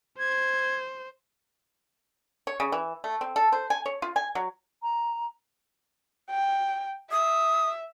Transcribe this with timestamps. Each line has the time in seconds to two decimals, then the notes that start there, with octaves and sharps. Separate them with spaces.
0.19 C5 G#6
2.47 C#5
2.60 C#3
2.72 E3
3.04 A3
3.21 C4
3.36 A4
3.52 C5
3.70 G#5
3.86 C#5
4.02 F4
4.16 G#5
4.35 F#3
4.83 A#5
6.30 G5
7.11 E5 D#6